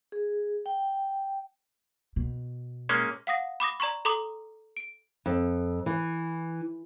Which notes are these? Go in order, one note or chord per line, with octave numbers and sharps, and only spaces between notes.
G#4
G5
B2
G#3 A#3 C#4
F5 F#5 D#6 A#6
B5 D6 D#6 A#6
D5 A#5 C6 C#6
A4 A#5 C6 D6 D#6
D7
F2
E3